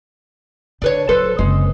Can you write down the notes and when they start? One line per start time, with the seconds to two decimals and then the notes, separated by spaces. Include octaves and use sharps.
0.82 D3 D4 B4 C#5
1.09 D#1 F#3 A4 B4 C5
1.39 F#1 C3 G#3